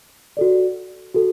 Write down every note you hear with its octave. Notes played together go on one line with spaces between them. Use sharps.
F#4 A4 D5
F#4 A4